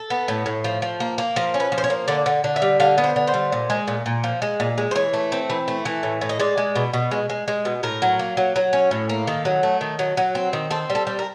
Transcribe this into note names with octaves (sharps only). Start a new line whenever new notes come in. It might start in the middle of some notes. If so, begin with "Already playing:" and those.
Already playing: A4
B3
A2
A2
F3
F3
A#3
A#3
F3 A#4
C#4
B4
F3
C5
C#5
A#3
D3 D5
D3
D3
E5
G3
D3 F5
B3
C5
D3
C5
G3
A#2
G#3
A#2
A#2
F3
G#3
A#2
G#3
C5
E3 C#5
A3
C4
E3
A3
E3
A2
A2
D#5
G#3 D5
G#3
B2
B2
G#3
G#3
G#3
B2
A2 A#4
F#3
A#3
F#3
F#3
C#4
A2
A#3
D#3 A4
F#3
A3
D#3
F#3
F#3
C4
D#3
C4 A4
G3
A4
G3
A#4